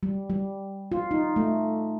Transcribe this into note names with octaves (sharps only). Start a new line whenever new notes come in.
G3
G3
F4
D#4
A3